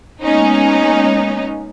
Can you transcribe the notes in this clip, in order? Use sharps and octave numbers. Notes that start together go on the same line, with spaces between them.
G#3 A#3 B3 C#4 D#4